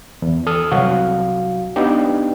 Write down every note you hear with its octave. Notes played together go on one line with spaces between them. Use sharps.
E2
A4 D#6 F6
C2 F#3 F#4 F5
B3 D4 D#4 G4